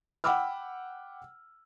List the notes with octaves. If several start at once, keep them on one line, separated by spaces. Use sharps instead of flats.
F#5 G5 B5 D6 E6 F6